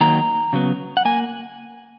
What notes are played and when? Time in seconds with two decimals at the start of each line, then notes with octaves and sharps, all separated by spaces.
0.01 D#3 F#3 A#3 A#5
0.53 C#3 F#3 B3
0.97 F#5
1.05 A#3 G#5